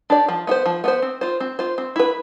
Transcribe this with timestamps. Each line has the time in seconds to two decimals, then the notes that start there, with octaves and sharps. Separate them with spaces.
0.10 D4 G4 D5
0.29 F3
0.47 B3 F4
0.51 C5
0.66 F3
0.84 B3 F4 C5
1.02 C4
1.21 F4 C5
1.40 C4
1.59 F4 C5
1.78 C4
1.96 E4 B4